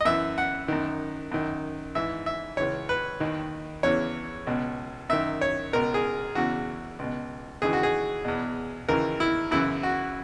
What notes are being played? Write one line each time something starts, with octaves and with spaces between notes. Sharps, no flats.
D#5
F#2 E3 E5
F#5
F#2 D#3
F#2 D#3
G#2 E3 E5
E5
C#2 C#3 E3 C#5
B4
D#2 D#3
E2 C#3 E3 C#5
C#2 B2
F#2 D#3 E5
C#5
C#2 B2 A#4
G#4
E2 C#3 E3 F#4
C#2 B2
D#2 C#3 E3 G#4
F#4
G#4
E2 B2
D#2 C#3 E3 A#4
E4
F#2 C#3 E3 E4
F#4